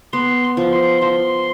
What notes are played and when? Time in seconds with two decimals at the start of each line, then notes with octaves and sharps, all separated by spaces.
0.13 B3 C6
0.57 F3
0.72 C6
1.01 F3 C6